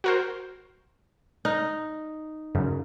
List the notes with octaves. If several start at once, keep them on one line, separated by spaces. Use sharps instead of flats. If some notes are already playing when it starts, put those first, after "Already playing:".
F#4 A#4 C5
D#4 F6
F#2 C#3